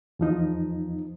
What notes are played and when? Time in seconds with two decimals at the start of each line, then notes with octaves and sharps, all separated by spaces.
0.19 E2 F3 D#4